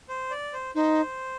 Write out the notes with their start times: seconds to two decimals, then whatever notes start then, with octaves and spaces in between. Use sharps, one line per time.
0.09 C5
0.31 D5
0.53 C5
0.75 D#4 C5